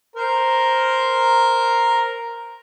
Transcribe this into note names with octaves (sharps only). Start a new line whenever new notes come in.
A#4 C5 A#5